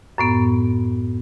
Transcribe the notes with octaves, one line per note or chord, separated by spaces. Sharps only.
F#2 A2 B3